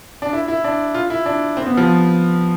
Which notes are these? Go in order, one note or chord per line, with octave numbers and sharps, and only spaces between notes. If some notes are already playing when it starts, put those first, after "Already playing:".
D4
E4
E4
D4
F4
E4
D4
C4
B3
F3